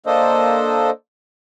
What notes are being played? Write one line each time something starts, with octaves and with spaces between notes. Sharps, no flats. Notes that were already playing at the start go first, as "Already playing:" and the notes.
A#3 D4 A4 C5 D#5